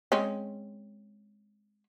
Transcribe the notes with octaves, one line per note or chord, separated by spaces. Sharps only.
G#3 C4 C#4